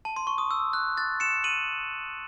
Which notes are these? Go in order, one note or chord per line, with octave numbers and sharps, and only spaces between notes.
A5
C6
C#6
D#6
E6
F#6
F#6 A6
C#7 E7
D#7 F#7